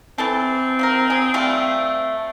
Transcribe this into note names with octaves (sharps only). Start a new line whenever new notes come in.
E3 C4 A4 A5
F3 A4 A#4
G#4
G3 A3 F4